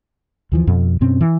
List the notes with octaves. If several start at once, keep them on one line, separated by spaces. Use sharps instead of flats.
D#2 E3 F3
F2 B2
F#2 B2 C4 C#4
E3